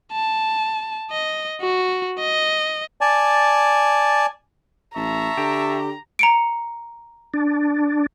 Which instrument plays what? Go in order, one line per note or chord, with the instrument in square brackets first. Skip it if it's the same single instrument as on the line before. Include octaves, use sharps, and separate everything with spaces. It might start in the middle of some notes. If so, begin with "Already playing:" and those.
[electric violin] A5
D#5
F#4
D#5
[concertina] D5 G#5 A5
[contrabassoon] A1 [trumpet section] E5 A5 C#6 [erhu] A#5
[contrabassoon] D3 [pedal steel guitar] G4
[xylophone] A#5 C#7 D7
[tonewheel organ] D4